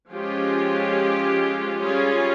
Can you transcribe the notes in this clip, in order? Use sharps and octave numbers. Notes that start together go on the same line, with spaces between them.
F3 G#3 C#4 F4 G4
G3 C#4 F4 G#4